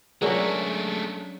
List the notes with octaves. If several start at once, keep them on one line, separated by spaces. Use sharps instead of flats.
F#3 G#3 A3 C#4 D4 G#4 A#4 D5